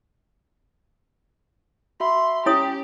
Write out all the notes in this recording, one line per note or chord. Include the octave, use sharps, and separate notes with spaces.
F#4 E5 B5 C6
C#4 E4 G4 C#5 D#6